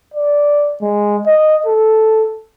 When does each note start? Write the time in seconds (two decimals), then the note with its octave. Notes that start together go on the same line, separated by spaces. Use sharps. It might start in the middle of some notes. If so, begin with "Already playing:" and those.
0.14 D5
0.82 G#3
1.27 D#5
1.67 A4